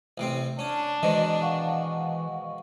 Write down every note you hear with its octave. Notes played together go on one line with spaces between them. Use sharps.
A1 C3 C4
C#4 D4
G#2 B2 D#3 E3 D#5
F5 F#5 C#6